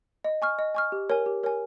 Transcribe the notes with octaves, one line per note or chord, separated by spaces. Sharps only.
D#5
G#5 C#6 F6
D#5
G#5 C#6 F6
G4
A#4 C#5 G#5
G4
A#4 C#5 G#5